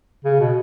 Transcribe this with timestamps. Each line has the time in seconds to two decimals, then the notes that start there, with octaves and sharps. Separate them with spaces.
0.24 C#3
0.40 B2